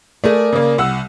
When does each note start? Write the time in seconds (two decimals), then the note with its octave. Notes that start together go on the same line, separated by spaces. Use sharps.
0.24 A3 G#4 A#4 D5
0.52 C#3 A#3
0.78 C2 F#5 E6